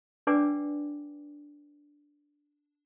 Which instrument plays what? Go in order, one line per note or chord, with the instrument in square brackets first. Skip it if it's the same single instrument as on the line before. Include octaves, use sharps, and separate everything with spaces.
[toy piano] D4 B4 D5 G5 G#5 D6